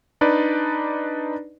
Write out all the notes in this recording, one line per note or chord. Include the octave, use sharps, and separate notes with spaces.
D4 D#4 B4 D5